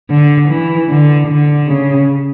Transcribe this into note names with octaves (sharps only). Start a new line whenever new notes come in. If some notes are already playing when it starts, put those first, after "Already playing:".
D3
E3
D3
D3
C#3